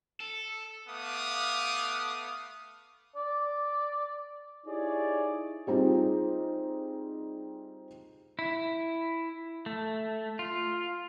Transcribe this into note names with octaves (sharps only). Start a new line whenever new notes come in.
A4
A3 B3 F5 D6 D#6
D5
D#4 E4 G4 G#4 C#5 D5
G3 C4 D#4 F4 G#4
E4
A3
F4